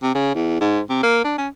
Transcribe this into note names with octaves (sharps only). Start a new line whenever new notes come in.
C3
C#3
E2
G#2
C3
A#3
D4
C#4